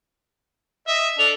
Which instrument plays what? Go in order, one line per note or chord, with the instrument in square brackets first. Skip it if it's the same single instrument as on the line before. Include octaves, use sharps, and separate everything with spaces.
[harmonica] D#5 E5
[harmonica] D4 A4 [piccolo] F7